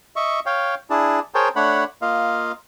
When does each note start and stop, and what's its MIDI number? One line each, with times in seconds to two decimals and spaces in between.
0.16 0.40 75
0.16 0.40 76
0.16 0.40 85
0.46 0.75 73
0.46 0.75 77
0.46 0.75 79
0.90 1.20 62
0.90 1.20 64
0.90 1.20 68
0.90 1.20 81
1.35 1.49 68
1.35 1.49 70
1.35 1.49 72
1.35 1.49 73
1.35 1.49 79
1.35 1.49 81
1.56 1.84 57
1.56 1.84 62
1.56 1.84 73
1.56 1.84 78
1.56 1.84 83
2.02 2.52 58
2.02 2.52 65
2.02 2.52 75
2.02 2.52 77